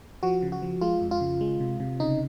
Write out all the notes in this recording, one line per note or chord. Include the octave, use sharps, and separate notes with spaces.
F3 F#4
C#3
F#4
F3
G#3 F4
F2
F4
C#3
G#3
C3
C3
C#3 D#4